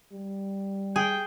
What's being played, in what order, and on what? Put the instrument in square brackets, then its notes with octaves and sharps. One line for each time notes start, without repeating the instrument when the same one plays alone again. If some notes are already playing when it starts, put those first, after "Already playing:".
[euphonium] G3
[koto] G#4 [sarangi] G5